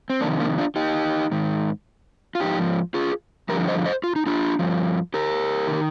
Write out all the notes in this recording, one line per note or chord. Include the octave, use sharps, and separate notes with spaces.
C4
F2 C3 D#3 A#3 D4
A#3 D4
D4 F4
D#4 G4
G#2 D#3
F4
G#2 F3 D#4 G4
F4 G#4
G2 D3 F3 G4 A#4
C5 D#5
C5 D#5
F4
D#4
D4 F4
G2 F3
G4 A#4
C3 D#3